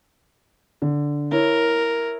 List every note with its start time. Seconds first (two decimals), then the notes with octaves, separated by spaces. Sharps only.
0.82 D3
1.32 E4 A#4 C#5